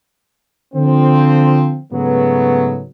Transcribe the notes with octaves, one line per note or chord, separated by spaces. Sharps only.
D3 F3 C4
G#2 C#3 F#3 A3 B3